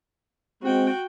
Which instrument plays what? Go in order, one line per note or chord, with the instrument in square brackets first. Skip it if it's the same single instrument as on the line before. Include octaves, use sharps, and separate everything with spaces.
[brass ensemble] G#3 C4 [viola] F#4 G5